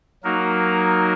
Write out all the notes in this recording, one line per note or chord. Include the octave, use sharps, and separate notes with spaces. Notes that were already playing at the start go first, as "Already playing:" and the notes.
F#3 A#3 D#4 F#4 A#4